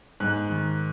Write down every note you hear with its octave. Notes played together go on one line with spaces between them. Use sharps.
G#2 F#6
D#3